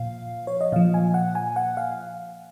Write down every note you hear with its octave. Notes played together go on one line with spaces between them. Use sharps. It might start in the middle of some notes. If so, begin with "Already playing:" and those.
Already playing: A#2 F3 F5
C#5
D#5
A#2 F3 F5
G#5
F#5
G#5
F#5
F5